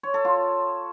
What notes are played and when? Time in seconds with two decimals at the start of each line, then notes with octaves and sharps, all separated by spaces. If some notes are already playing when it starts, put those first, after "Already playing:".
0.03 C#5
0.14 A4
0.25 F4